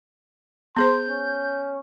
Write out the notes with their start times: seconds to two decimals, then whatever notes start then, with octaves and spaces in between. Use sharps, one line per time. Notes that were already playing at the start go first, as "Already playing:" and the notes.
0.76 B3 G#4 C5 C6 G6
1.08 C#4